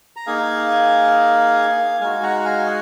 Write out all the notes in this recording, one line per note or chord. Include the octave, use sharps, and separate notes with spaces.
A#5
A#3 D#4 G#4 F5 G#5
G#3 D#4 F#4 F5 G#5
F#5 A#5
F#5
F5 G#5
D#5 F#5